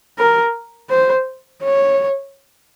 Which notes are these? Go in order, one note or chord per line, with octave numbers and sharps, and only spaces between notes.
A#4
C5
C#5